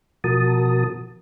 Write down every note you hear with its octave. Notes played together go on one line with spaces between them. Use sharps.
B2 F3 F#4 A#4 A5 D#6